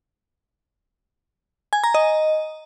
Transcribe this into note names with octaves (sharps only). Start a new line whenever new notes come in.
G#5
A#5
D#5